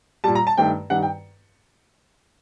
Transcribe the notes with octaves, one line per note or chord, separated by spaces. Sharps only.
A#2 G3 A5
A#5
A5
G2 D#3 A3 G5
G2 D#3 G3 F#5
G5